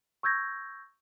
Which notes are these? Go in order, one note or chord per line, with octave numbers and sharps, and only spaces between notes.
C#6 E6 G6 G#6 A#6